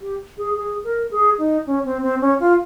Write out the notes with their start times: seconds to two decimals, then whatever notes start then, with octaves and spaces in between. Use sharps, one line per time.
0.01 G4
0.38 G#4
0.56 G#4
0.84 A#4
1.11 G#4
1.39 D#4
1.67 C#4
1.85 C4
2.03 C4
2.21 C#4
2.40 F4